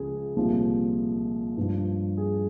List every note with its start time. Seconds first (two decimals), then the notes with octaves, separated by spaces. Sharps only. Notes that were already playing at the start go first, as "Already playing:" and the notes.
Already playing: C#2 C#3 F3 G#4
0.36 C2 A#2 F3
1.57 G2 F3
2.17 G#4